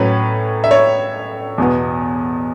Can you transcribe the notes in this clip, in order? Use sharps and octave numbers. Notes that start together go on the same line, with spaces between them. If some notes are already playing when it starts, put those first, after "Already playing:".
Already playing: A2 F#3 C#4 B4
E5
C#5
E2 B2 B3